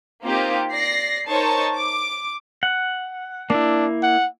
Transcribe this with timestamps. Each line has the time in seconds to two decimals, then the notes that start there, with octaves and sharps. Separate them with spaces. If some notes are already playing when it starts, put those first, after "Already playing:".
0.22 A#3 C4 D#4 F4 G4
0.72 D5 A#6 C7
1.28 D#4 A#4 C5 C#5 A5 C#6
1.75 D6
2.63 F#5
3.50 A#3 D4 E4
4.03 F#5